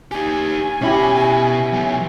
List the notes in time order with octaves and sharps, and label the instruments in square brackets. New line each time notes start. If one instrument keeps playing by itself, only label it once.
[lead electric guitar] D#4 G4 [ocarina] G#5
[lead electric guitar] B2 B5 [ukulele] C#4 E4 G4
[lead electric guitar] F#3 B3